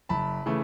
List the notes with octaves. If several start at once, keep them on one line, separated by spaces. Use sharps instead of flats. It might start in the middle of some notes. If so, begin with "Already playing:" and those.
F#1 A5 B5
C#3 E3 A3